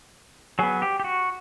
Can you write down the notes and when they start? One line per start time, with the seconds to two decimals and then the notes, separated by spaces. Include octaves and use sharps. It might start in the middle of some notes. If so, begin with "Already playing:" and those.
0.59 F#3 B3 G#4
0.82 G4
1.00 G4
1.04 F#4